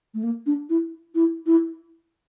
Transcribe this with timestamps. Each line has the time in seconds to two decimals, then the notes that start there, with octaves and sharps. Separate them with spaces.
0.14 A3
0.23 A#3
0.46 D4
0.69 E4
1.15 E4
1.46 E4